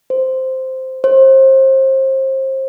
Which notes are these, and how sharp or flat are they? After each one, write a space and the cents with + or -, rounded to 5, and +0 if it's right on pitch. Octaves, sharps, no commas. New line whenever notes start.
C5 -5
C5 +30